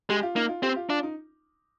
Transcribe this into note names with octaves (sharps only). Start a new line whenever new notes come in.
G#3 G4
F4
A#3 D#4
F4
C4 G4
F4
D4 F4
D#4